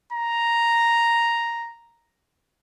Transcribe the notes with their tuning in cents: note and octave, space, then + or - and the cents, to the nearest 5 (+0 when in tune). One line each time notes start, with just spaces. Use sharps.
A#5 +0